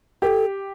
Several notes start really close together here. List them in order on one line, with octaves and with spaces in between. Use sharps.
G4 A#4 A4